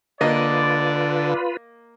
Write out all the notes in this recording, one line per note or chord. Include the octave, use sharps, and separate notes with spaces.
D3 A#3 F4 B4 D5 D#5